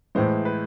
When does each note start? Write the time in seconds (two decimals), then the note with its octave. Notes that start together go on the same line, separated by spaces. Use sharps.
0.15 A2 E3 G#3 C5
0.45 B4